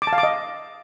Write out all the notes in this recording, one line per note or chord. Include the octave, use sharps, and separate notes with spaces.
D6
A5
F5
D6
D#5